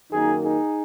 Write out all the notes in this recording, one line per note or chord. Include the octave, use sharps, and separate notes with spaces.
F#2 D#3 A#3 D#4 G#4
D#4 G#4